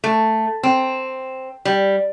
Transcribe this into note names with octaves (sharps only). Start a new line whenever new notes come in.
A3
C4
G3